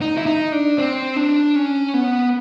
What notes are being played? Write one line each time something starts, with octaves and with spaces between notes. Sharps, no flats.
D#4
E4
D#4
D4
C4
D4
C#4
B3